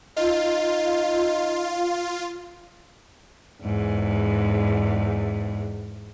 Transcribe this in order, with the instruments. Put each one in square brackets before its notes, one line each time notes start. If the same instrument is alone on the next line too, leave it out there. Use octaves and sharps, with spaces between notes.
[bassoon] D#4 [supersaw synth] F4
[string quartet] E2 G#2